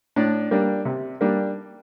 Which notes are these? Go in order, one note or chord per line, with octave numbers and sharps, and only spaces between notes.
A2 D4 D5
G3 A#3 D4
C3
G3 A#3 D4